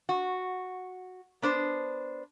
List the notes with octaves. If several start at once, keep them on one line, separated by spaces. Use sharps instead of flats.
F#4
B3 D4 C5